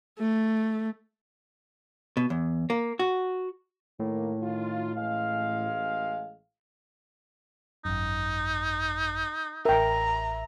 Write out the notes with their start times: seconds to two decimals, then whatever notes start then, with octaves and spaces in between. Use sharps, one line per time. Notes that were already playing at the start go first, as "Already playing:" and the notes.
0.19 A3
2.17 B2
2.30 E2
2.70 A#3
2.99 F#4
4.00 A2 D#3 A#3
4.40 D#3 F4
4.95 A1 G#3 F5
7.85 G#1 F#2 D#4
9.65 A1 A#4 E5 G5 A#5